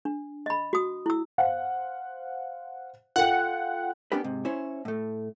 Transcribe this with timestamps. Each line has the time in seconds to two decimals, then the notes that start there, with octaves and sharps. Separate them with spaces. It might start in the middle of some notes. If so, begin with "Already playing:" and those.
0.05 D4
0.46 D#5 B5
0.73 F#4 D#6
1.06 E4 E6
1.38 C5 F5 F#5
3.16 F4 A4 F#5 G5
4.12 B3 C#4 D4 G4 A#4 B4
4.24 G#2 C3
4.45 C#4 E4 C5 C#5
4.85 A2 A3